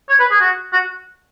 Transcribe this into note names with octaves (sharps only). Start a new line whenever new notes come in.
C#5
B4
G#4
F#4
F#4